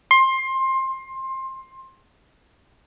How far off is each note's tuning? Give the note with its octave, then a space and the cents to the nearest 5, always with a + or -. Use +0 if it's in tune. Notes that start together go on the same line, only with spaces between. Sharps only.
C6 +20